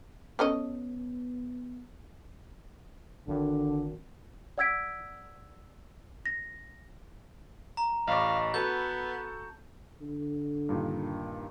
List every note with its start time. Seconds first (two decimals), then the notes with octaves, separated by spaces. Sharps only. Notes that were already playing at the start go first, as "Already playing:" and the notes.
0.39 B3 C#4 A4 D#5
3.27 G#1 D3
4.58 D5 F#5 E6 G#6 B6 D7
6.26 A#6
7.77 A#5
8.07 A1 D5 D#5 F5 B5 C#6
8.54 B3 F#4 A4 A5 B5 G6
10.01 D3
10.69 G2 A#2 D#3